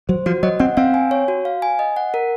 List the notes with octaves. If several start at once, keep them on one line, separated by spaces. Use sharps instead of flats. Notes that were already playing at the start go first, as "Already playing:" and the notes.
F#3 C5
F3 F#4
F#3 D#5
C4 F#5
C4 F5
G#5
C#5
F#4
F5
G#5
D#5
F#5
A#4